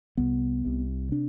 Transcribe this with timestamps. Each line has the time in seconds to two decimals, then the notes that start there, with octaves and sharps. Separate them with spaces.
0.17 C2 C3 B3
0.65 C2 C3
1.12 C3 D4